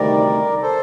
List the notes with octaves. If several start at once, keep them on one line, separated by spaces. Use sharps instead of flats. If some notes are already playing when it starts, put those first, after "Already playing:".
Already playing: D2 C3 D#3 G3 A#4 D5
A4 C5